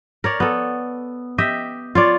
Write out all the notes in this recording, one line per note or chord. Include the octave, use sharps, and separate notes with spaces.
A#4 C#5 D5
B3 A4
G4 D#5 E5
F4 C#5 D5